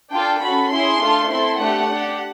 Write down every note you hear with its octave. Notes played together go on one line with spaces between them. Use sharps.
D4 F4 A4 G5
C#4 F#4 A4 B5
C#4 E4 G#4 C6
A3 D4 F4 A4
C4 E4 A4 C6
A3 D4 G4 F#5
D4 G4